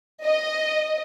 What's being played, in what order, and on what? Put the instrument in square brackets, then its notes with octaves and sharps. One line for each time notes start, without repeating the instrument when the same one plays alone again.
[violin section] D#5